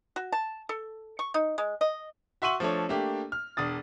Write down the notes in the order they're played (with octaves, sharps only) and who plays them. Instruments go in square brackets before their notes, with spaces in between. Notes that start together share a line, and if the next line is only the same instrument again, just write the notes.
[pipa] F#4
A5
A4
C#6
D#4
G#3
D#5
[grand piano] F#4 E5 C6 C#6 D#7 F#7
F3 A3 D4 A4 C#5
A3 A#3 D4 G4
F6
E1 D4 D#6 A6